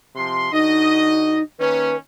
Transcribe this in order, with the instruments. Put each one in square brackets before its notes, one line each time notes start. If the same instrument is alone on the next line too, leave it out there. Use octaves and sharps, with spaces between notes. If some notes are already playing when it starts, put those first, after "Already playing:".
[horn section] C3 F3 C6
[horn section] D3 F#4 D#5 [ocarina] D#4
[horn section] D#3 A#3 C#4 [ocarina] B4